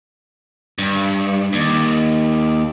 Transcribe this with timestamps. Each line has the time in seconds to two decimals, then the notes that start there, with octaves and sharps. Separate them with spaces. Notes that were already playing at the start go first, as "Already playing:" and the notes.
0.78 G2
1.53 D#2